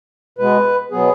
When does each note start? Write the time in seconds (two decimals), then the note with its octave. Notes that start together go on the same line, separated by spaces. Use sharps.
0.38 B2 G#3 B3 B4
0.91 B2 F#3 B3 G#4